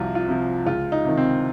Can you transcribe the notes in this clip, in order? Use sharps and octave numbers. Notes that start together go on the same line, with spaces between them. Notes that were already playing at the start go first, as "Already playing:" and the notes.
Already playing: C2 C3 F3 F4 F#4
F4
C3 F3
C#2 F4
D#4
C3 D#3
C4